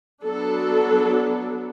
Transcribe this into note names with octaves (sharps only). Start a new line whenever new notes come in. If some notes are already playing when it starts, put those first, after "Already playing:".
F#3 B3 D4 A4